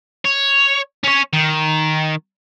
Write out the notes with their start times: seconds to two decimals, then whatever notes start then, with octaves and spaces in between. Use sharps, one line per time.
0.25 C#5
1.04 C#4 C#5
1.33 D#3